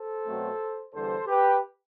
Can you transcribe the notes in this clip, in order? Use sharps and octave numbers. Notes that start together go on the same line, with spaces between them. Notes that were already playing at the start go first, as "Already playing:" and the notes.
Already playing: A4 C5
B2 F#3 A3 C4
E2 D3 G3 A4 C5
G4 B4